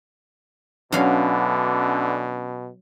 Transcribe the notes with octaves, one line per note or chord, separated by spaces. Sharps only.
B2 D3 E3 F#3 C#4 D4 F5